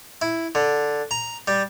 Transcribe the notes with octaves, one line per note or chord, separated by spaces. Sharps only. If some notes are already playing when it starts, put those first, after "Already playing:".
E4
D3
A#5
G3